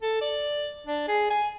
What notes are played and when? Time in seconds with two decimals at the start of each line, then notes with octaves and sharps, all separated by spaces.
0.02 A4
0.21 D5
0.86 D4
1.08 G#4
1.31 G#5